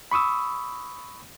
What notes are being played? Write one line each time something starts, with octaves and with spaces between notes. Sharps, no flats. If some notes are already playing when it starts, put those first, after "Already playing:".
B5 C#6 D#6 E6